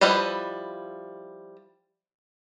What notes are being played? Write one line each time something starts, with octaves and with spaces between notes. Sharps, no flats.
F3 G3 E4 B4 D#5